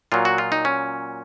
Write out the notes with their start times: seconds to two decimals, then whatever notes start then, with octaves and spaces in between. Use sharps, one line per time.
0.12 A#2 F#3 F4
0.25 F#4
0.38 F4
0.52 D#4
0.65 C#4